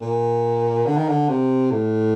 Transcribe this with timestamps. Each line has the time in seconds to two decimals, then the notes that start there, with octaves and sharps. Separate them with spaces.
0.01 A#2
0.86 D3
0.97 D#3
1.09 D3
1.29 C3
1.71 A2